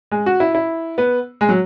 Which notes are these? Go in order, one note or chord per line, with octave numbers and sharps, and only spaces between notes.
G#3
F#4
E4
E4
B3
G#3
F#3